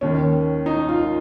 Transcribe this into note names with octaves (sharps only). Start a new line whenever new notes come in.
D#2 D#3 C#4
D#4
F4